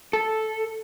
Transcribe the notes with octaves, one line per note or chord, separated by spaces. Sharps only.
A4